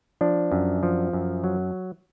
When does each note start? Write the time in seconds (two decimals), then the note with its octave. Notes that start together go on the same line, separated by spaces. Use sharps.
0.21 F3 D4
0.52 F#2
0.83 F3
1.13 F#2
1.44 F#3